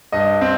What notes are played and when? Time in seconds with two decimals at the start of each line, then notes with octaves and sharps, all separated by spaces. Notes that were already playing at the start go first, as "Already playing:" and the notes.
0.12 G2 D#5
0.41 C4